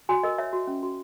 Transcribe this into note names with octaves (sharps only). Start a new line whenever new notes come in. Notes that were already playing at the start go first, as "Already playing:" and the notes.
F#4 G#5
A#4 D#5
C#5 E5
F#4
C#4
F#4